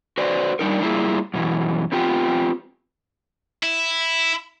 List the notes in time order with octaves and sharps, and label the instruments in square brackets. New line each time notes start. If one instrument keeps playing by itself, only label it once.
[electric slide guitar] F#4 B4 C5 D5
G3 D4 D#4 A#4
G3 A#3 E4 F4 G#4
F#2 B2 E3
B3 C4 F4 G4
[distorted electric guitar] E4